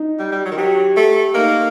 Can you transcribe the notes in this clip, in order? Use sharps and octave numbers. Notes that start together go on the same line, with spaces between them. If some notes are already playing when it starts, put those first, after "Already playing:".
Already playing: D#4
G3
G3
F#3
D#3
F#3 G4
A3
A#3 D#4